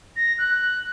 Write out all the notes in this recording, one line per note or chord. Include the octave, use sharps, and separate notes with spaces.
A#6
F#6